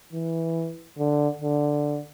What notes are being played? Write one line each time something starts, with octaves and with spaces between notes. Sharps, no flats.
E3
D3
D3